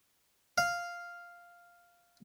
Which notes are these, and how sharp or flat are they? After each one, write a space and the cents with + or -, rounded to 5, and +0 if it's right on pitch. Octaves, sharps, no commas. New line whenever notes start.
F5 +0